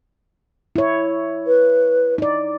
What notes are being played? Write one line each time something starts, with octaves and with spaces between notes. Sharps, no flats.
E4 C#5
B4
D#4 D5